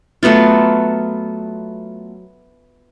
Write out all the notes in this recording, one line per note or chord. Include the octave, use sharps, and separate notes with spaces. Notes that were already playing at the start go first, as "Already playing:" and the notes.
F#3 A3 B3 F4